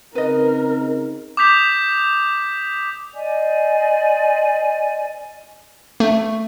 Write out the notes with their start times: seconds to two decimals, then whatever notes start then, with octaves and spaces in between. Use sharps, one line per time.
0.15 C#3 C4 D#4 A#4 B4 D#5
1.37 D6 D#6 G6 B6 F7
3.14 C5 D5 D#5 G#5
6.00 A3